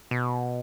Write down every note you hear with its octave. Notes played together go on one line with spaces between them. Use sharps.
B2